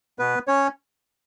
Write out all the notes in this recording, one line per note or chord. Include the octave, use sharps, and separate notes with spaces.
B2 B3 B4
C#4 C#5